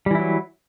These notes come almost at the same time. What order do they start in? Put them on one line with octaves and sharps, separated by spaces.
G3 E3 E4 F#3